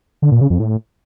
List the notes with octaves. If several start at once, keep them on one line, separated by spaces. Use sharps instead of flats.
D3
A#2
C#3
F2
A2